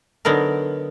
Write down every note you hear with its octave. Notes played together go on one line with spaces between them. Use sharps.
D3 F#3 B3 D#4 A#4